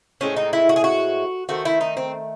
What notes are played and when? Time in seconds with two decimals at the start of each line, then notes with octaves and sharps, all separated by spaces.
0.21 A2 G#3 C4 C#4
0.37 D#4
0.53 E4
0.69 F#4
0.76 G#4
0.84 F#4
1.49 D#3 A3 C4 F#4
1.65 E4
1.81 D#4
1.97 C4